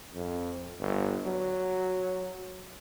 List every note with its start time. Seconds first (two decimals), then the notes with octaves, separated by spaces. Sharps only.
0.14 F2
0.80 G1
1.25 F#3